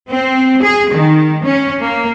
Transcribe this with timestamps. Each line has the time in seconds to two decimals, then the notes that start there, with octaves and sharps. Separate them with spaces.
0.11 C4
0.63 G#4
0.92 D#3
1.43 C#4
1.82 A#3